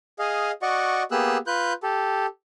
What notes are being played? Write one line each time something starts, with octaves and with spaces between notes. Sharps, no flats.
G#4 D#5 F5
F#4 D5 D#5 F#5 C#6
A#3 B3 G4 G#4 E6 F#6
F4 B4 F#6 G6
G4 A4